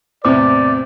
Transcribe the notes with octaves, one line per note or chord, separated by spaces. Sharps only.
E2 A2 C3 C5 D5 D6